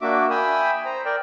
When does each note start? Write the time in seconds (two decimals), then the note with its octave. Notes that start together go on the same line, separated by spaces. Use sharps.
0.01 A#3 D4 F#4 E5 D6
0.30 E5 G5 G#5 B5 D#6 E6
0.85 C5 A#5
1.05 A#4 D5 G5